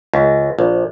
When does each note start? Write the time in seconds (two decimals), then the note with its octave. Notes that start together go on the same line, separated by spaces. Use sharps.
0.14 C#2
0.59 A#1